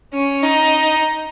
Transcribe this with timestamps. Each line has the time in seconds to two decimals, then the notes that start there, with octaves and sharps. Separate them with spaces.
0.14 C#4
0.43 D#4